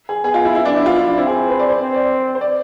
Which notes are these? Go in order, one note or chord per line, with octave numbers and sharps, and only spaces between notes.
G#4
B3 G#4
F4
E4
E4
D4
E4
F4
E4
D4
C4 E4
G#4
B4
D5
C5
C4
D5
C5
D5